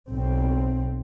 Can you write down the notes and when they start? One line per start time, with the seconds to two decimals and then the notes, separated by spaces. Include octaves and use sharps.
0.11 B1 C4